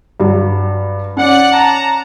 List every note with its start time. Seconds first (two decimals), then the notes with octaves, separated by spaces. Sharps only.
0.20 G2 F#3
1.17 C#4 D5 F#5
1.52 A5 A#5